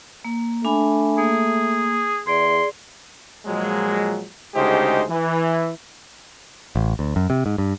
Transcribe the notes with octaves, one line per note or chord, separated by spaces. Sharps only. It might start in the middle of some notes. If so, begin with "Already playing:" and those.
A#3
A3 D4 G#5 B5
A#3 G#4
E2 G#4 D5 C6
A#2 F3 F#3 G#3
D2 C#3 G#3 D#4 G4 C5
E3
A1
D2
F#2
C3
G#2
G2